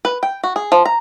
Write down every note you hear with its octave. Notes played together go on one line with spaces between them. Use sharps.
B4
G5
F#4
G#4
F3
A#5